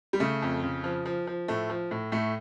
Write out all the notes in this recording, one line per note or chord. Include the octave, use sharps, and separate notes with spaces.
G3
C#3 A3
F2
C#3
F3
F3
F3
A2 A3
F3
A2
A2 A3